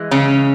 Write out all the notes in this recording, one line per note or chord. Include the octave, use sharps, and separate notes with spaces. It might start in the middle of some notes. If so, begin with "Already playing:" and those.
Already playing: E3 G#3
C#3 C#4